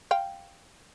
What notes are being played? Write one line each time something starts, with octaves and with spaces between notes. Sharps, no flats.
F5 G5